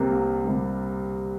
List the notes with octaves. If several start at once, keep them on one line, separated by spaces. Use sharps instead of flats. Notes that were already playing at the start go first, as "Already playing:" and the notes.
Already playing: C2 C3 G3 A#3
C2
C3 G3 A#3